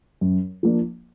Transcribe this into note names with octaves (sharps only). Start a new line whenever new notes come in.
F#2
F3 A#3 D4